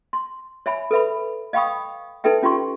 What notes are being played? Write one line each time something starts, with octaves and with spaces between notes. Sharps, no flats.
C6
C#5 E5 G#5 B5
A4 B4 E5 B5
D#5 F5 G5 B5 C#6 D#6
D#4 A4 B4 E5 G5
C#4 F4 G4 C6 C#6